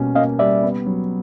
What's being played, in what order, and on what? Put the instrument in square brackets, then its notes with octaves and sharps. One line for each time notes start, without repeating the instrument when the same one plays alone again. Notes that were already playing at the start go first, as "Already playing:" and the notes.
Already playing: [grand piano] B2 G3 A#3 C#4
[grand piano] A#3 [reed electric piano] D#5 F5
[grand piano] G3 [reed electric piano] D5 E5
[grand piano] B3
F#3